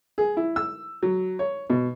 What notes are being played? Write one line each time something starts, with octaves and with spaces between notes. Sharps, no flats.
G#4
E4
E6
F#3
C#5
B2